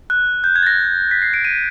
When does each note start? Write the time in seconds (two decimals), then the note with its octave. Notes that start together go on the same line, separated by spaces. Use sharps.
0.10 F#6
0.44 G6
0.56 G#6
0.63 A6
0.67 A#6
1.11 B6
1.22 C7
1.34 D7
1.45 D#7